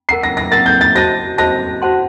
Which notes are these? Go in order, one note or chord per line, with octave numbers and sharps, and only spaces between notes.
A#4 F#5 A#5 C7
A#6
A#6
A#4 F#5 A#5 A6
G6
A6
F#4 C5 D#5 A5 A#6
F#4 C5 D#5 A5 A#6
F#4 C5 F#5 A5 C6